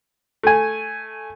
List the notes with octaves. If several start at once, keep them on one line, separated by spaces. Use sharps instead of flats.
A3 G#5